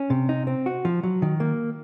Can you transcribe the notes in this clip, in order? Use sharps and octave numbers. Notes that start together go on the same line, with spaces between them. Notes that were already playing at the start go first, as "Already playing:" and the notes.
Already playing: C#4
C3
D#4
C4
F#4
F3
F#3
D#3
A#3